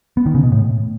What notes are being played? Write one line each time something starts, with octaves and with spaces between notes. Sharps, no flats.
B3
D#3
C#3
B2
A2